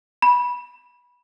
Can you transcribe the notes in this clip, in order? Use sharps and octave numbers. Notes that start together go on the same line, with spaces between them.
B5